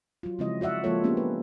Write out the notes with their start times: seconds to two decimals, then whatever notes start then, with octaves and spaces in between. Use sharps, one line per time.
0.23 F#3 F4
0.39 C#3 F3 G#3 C4 E4 D#5
0.61 F#4 D5 E5 F#5
0.84 F3 G#3 A#3 F4 A4 C#5
1.04 A#3 B3 C#4 D4 G4
1.17 B4